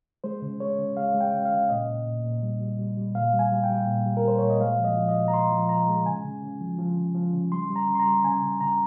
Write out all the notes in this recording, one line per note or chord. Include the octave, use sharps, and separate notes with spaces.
G#3 C5
C#3
G#3 C#5
C#3
G#3 F5
G#3
G5
C#3
F5
C#3
A#2 D#5
A#2
A#2
A#2
G3
G3
G3
G3
A#2 F5
G3
G#5
G3
G5
G3
A#2
G3
A#4
G3 C5
A#2 C#5
D#5
G#3 F5
F3
D#5
F3
D#5
A#2
A#5
A#2 C6
F3
F3 A#5
G#3
C#3 G#5
C#3
C#3
F3
F3
C#3
F3
C#3
G3 C6
G3
A#5
C#3
C6
A#5
G3
C#3 G#5
C#3
C#3 A#5